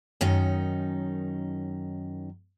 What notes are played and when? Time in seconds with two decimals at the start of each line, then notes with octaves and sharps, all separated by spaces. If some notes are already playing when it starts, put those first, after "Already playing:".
0.21 F#2 D#3 C#4 D#4